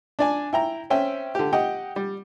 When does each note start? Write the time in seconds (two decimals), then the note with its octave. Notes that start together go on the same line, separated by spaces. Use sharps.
0.19 D4 D5 G#5
0.53 E4 G5 A#5
0.90 C4 C#4 E5 G5
1.35 D3 G4
1.53 G4 D#5 F#5 G5
1.96 G3